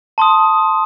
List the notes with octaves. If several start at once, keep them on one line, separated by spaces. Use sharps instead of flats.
A5 C6 D#6